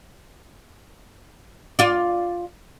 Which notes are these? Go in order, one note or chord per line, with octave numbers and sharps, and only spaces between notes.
F4 D5